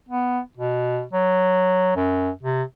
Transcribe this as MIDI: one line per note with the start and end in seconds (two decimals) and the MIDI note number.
0.09 0.40 59
0.57 1.03 47
1.13 1.93 54
1.96 2.30 42
2.43 2.63 48